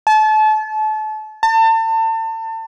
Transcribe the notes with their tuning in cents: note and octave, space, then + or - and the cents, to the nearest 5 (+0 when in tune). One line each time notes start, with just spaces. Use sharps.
A5 -30
A5 +35